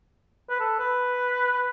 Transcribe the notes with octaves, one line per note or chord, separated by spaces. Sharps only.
B4
A4
B4